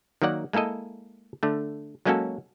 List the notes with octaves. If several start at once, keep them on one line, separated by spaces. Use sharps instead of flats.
D#3 F#3 A#3 D5 F#5
G#3 A#3 E4 A4 D#5
D3 A3
F#3 G#3 A#3 C#4 F#4 A4